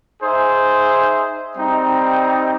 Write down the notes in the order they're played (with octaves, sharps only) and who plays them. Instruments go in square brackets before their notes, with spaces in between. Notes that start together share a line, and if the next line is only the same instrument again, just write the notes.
[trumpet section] D#4 G#4 C5 E5
G3 C4 D#4